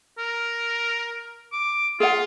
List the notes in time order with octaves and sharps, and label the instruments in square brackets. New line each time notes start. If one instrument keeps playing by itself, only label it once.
[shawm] A#4
D6
[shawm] F4 [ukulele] G#4 F#5